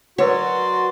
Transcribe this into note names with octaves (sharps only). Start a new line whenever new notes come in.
F#3 F#4 A#4 B4 C#5 D5 F#5 C6